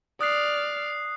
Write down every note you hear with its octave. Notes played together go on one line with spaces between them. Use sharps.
D5 D#6 F6 F#6 C7